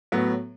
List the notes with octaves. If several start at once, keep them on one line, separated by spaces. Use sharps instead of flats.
A2 F#3 B3